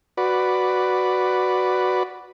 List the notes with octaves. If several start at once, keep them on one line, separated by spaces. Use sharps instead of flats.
F#4 B4 D5